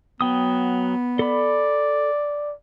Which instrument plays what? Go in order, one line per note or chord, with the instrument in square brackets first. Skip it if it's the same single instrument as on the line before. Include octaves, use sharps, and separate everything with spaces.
[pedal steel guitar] F#3 G5 D#6 [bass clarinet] B3
[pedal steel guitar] A4 B5 [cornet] D5